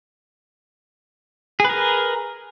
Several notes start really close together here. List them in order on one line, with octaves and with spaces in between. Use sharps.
G#4 B4 A#4